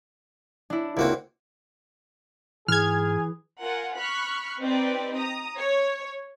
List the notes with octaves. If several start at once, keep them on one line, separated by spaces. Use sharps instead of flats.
D4 E4
C#2 A#3 C4 E4 F#4
G#2 E3 G#4 F6 G#6
F4 A#4 F#5 G#5
B5 C#6 F6 F#6
C4 D#4 G4 B4 D5
A#5 D#6
C#5